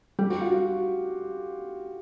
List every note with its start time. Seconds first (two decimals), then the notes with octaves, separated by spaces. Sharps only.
0.19 G3 G4
0.30 F#4
0.41 F4
0.52 F#4